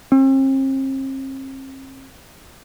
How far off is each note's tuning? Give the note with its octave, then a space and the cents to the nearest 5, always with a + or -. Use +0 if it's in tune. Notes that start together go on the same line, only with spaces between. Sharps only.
C4 +40